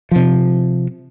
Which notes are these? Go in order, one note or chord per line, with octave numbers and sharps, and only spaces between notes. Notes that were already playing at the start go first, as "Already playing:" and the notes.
C3 F3